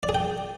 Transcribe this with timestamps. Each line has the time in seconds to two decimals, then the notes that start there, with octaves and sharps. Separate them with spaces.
0.03 D5
0.09 G#4
0.15 G5